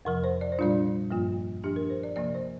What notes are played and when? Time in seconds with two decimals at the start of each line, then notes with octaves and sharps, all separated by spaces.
0.05 F2 C3 F3 A#4
0.24 C5
0.41 D5
0.52 C5
0.59 A#2 G3 D4 F4 D5
1.11 G2 F3 A#3 F4
1.64 G2 F3 D4 G4
1.76 A#4
1.90 C5
2.03 D5
2.16 C3 F3 A#3 D5
2.34 C5